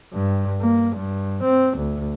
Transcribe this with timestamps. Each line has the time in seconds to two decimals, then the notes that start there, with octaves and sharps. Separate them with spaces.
0.13 G2
0.61 A#3
0.96 G2
1.43 C4
1.77 D2